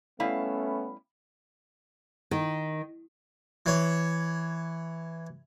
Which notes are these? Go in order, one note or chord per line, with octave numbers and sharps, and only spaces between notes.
G3 A3 B3 C#4 E4 F5
D#3
E3 C#5